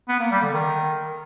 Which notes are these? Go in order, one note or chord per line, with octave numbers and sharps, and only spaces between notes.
B3
A#3
G3
D3
D#3